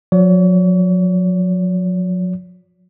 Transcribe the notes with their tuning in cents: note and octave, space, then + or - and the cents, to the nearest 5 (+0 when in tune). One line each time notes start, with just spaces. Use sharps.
F#3 -40 C#5 +45